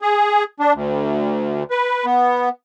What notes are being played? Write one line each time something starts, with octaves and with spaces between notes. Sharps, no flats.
G#4
D4
D2
B4
B3